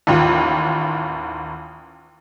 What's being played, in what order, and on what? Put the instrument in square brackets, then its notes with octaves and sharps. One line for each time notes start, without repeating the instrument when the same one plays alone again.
[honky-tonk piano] A1 D#2 F4